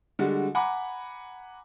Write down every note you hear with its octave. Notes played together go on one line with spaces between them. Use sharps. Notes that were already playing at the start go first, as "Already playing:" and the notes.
D3 G3 G#3 F#4
F#5 G#5 A#5 B5 D6